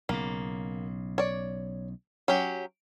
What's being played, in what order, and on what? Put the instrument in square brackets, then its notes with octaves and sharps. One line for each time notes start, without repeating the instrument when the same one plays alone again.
[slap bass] B1 C#3 [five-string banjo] A#3
[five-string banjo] C#5 D5
F#3 C#4 G4